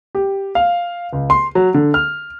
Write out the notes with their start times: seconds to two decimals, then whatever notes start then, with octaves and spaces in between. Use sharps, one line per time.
0.15 G4
0.55 F5
1.13 C#2
1.30 C6
1.55 F#3
1.74 D3
1.94 F6